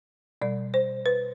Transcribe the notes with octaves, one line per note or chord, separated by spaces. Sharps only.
B2 G3 D5
C5
B4